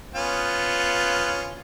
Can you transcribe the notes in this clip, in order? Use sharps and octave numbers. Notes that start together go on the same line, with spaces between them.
B3 C#4 F4